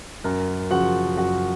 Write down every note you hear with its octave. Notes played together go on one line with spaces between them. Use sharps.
F#2 A#4
C#3 F3 F#4 F#5
F#2 F#4 F#5